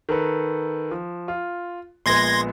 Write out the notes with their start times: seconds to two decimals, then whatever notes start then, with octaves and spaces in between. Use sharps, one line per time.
0.09 D#3 A4 B4
0.91 F3
1.28 F4
2.06 A#1 G#3 B3 C6 G#6 A#6